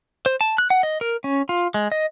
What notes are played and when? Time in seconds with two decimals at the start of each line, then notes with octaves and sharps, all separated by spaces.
0.26 C5
0.41 A5
0.58 F#6
0.70 F#5
0.83 D#5
1.01 A#4
1.24 C#4
1.49 F4
1.74 G#3
1.92 D#5